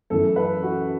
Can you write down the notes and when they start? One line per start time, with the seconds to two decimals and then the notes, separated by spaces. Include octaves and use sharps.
0.10 F#2 E3 A3 A4
0.36 B4
0.63 F#4